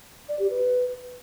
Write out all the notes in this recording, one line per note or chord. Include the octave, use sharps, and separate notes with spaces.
D5
G4
B4